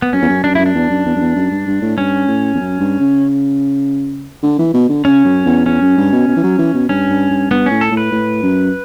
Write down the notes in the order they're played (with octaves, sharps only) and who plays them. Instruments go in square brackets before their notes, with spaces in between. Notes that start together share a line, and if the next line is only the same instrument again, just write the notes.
[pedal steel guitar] B3
[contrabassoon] F#2 [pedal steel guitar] C#4
[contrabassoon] E2
F#2
[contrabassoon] F#2 [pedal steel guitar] D4
[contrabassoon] F#2 [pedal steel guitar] E4
[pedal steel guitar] D4
[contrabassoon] E2
F#2
E2
F#2
E2
F#2
G2
G2
A2
[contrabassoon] G2 [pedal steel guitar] C#4
[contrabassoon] A2
E2
F#2
G2
C#3
D3
E3
B2
D3
[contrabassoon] C#3 [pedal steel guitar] C#4
[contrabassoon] F#2
E2
[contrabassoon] E2 [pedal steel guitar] C#4
[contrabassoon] F#2
G2
B2
B2
E3
F#3
E3
B2
[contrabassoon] G2 [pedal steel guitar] C#4
[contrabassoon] G2
G2
[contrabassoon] G2 [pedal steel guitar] B3
[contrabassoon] A2 [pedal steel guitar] C#4
[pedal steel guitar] A4
[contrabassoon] A2
[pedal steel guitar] B4
[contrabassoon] A2
F#2